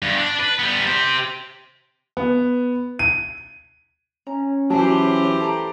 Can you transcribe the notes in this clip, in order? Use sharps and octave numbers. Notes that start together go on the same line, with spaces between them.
G2 B3
D4
B4
G3 B3
G4 C5
B3
D#7
C#4 A#5
E3 F#3 F#4 G4 C5 A5
A4 A#5